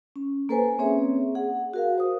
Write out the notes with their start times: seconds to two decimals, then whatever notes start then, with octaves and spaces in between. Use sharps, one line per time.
0.16 C#4
0.49 A#3 A4 B4 C5 G#5
0.79 A#3 C4 C#4 G#4 C#5 E5
1.35 G#4 F#5
1.74 F#4 A#4 F5
1.98 C5 D#6